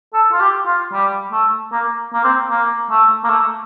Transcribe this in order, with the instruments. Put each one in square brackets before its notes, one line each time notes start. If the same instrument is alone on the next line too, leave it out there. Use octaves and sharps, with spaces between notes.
[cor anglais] A4
F4
G4
F4
G3
A3
A#3
A#3
C4
A#3
A3
A#3
A3